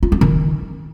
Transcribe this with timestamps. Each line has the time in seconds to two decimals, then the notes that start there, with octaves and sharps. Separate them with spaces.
0.03 F4
0.12 C4
0.21 D#3